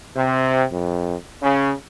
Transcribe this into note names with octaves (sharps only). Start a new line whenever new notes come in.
C3
F2
C#3